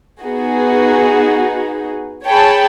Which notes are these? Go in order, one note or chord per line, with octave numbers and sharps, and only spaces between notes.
B3 D#4 F#4 G#4
G#4 C#5 G5 A5 B5